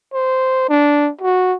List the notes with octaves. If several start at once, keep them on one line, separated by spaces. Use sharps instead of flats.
C5
D4
F#4